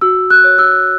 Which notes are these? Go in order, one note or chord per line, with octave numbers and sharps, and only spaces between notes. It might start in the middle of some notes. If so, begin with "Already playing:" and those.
F#4 E6
F#6
C#5
E6